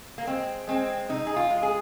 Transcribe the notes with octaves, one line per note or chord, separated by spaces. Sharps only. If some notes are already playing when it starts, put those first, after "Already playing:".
A#3
G#3 C4
G#3 C4
C3 D#4
G#4
F4
G#3
G#4